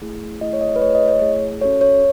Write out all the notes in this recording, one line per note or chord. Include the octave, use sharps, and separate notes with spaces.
A3 E4 G#4
A3 E4 G#4 D#5
C#5
D#5
B4
A3 E4 G#4 C#5
D#5
C#5
A3 E4 G#4
C#4 F#4 A4 C#5
C#5